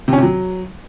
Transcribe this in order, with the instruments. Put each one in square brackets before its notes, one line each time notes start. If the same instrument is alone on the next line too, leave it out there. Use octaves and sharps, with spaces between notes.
[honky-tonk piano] C3
C#4
C3
F#3